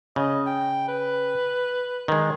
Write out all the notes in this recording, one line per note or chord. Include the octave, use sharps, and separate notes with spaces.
C#3 D#5
G5
B4
D#3 G#3